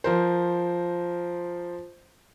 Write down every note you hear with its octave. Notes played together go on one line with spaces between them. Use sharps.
F3 A#4 C5